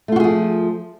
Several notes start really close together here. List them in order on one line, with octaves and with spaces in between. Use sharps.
A3 F4 F#4 G#4 F3